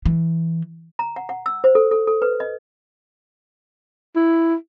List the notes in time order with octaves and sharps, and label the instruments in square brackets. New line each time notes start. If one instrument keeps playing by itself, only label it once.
[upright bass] E3
[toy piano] A#5
F#5
F#5
E6
C5
A4
A4
A4
B4
D#5
[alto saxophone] E4